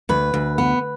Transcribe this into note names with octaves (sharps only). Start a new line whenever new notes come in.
D2 B4
D2
B3